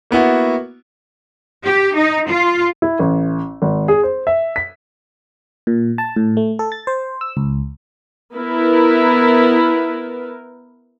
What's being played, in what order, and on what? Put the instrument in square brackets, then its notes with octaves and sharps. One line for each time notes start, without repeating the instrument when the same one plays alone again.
[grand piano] A#3 B3 E4 F#4
[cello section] G4
D#4
F4
[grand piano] E4
A1
G#1
G#4
C5
E5
B6
[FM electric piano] A#2
A5
A2
A3
A4
A6
C5
E6
C#2
[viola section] B3 E4 A#4 B4